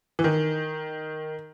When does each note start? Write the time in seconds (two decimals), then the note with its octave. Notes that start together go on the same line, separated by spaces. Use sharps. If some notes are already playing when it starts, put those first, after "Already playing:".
0.19 E3
0.24 D#3